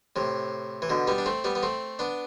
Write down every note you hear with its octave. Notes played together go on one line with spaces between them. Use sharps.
A2 C3
E3
B2 D3
G3 B3
D4
A3 C4
G3 B3
B3
A3 C4
B3 D4